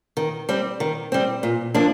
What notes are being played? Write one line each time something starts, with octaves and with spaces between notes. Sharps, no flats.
D#3
G3 C4
D#3
G3 C4
A#2
F3 A#3 D4